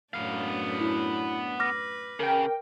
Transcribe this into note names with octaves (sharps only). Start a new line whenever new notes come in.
F#2 A2 B3 D4 F5
E4
B4 D6 F6 A#6
C#3 A#4 G5